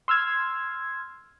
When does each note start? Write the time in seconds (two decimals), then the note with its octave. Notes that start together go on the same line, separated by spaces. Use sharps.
0.08 C6 E6 F6 G#6